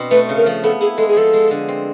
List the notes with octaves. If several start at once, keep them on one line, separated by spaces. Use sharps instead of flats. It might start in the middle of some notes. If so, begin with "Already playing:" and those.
Already playing: B2 C4 D4
A3 B4
C#3
A#4
F3
B3 A4
E4 G#4
G#3 A4
G#4
F3 A4
G#3
D3
C4